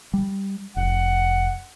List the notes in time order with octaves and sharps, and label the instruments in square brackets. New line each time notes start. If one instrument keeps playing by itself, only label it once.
[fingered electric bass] G3
[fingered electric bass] F1 [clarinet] F#5